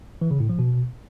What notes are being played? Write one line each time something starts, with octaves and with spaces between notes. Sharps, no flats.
E3
C#3
A2
F3
B2